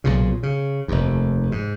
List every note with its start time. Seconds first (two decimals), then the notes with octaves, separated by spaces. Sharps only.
0.04 B1 A#2 C#3
0.43 C#3
0.88 F1 D#2
1.52 G#2